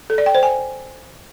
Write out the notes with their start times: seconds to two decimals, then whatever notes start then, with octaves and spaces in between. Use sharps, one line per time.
0.10 A4
0.18 D5
0.26 G5
0.35 C5
0.43 G#5